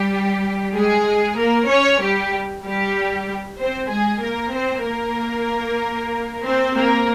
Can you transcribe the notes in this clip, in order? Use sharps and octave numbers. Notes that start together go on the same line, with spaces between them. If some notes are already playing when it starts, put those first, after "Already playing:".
Already playing: G3 G4
G#3 G#4
A#3 A#4
C#4 C#5
G3 G4
G3 G4
C4 C5
G#3 G#4
A#3 A#4
C4 C5
A#3 A#4
C4 C5
A#3 A#4